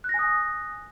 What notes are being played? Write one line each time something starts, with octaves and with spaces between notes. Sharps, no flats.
G#5 D#6 F#6 A#6